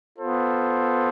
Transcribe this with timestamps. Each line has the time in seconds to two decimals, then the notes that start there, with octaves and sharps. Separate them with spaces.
0.17 B3 F4 A4 C5